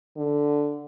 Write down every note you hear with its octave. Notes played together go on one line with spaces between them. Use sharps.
D3